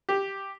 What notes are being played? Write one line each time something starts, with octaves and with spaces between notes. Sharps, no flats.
G4